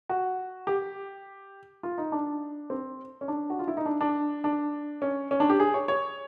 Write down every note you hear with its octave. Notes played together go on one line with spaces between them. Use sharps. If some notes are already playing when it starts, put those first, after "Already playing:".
F#4
G4
F4
D#4
D4
C4
C#4
D4
F#4
F4
E4
D#4
D4
D4
D4
C#4
C#4
D4
G4
G#4
C#5
C#5